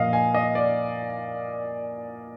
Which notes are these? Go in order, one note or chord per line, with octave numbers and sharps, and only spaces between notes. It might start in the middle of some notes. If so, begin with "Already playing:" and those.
Already playing: A#2 F3 D#5 F5
G#5
D#5
D5